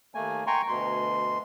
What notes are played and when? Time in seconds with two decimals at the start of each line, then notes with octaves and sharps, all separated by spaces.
0.15 D#2 A3 A#3 G#5
0.47 G5 G#5 A#5 C6 C#6
0.68 D2 B2 C6